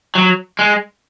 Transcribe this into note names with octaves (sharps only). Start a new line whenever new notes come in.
F#3
G#3